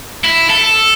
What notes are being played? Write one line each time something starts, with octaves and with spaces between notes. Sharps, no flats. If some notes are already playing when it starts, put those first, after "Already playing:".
E4
A4